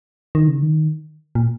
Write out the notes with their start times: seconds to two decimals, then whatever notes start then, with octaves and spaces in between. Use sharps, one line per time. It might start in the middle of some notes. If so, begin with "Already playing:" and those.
0.35 D#3
0.48 C#3
0.62 D#3
1.35 A#2